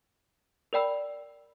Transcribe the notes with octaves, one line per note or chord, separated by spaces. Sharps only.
A#4 D5 G5 B5 E6